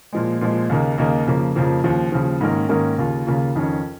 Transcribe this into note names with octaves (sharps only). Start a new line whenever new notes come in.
A#2 F3 G#3
A#2 F3 G#3
D#2 C#3 A#3 D#4
D#2 C#3 A#3 D#4
F2 C#3 F3 A#3
F2 C#3 F3 A#3
D#2 C#3 F3
D#2 C#3 F3
G#2 D#3 A#3 C#4 A#4
G#2 D#3 A#3 C#4 A#4
D#2 C#3 A#3 F4
D#2 C#3 A#3 F4
F2 D#3 C#4